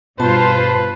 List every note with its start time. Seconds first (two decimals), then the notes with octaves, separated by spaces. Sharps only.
0.20 G2 B2 F4 B4 C5 A5